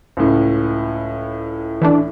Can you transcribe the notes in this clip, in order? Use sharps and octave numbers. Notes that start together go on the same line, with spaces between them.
C#2 A2
E3 A3 D4